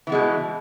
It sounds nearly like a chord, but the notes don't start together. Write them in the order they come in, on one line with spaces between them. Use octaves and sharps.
E3 B3 G#3 B2